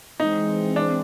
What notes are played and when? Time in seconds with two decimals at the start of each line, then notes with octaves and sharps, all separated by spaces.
0.20 E3 G#3 C4 D#4
0.76 D4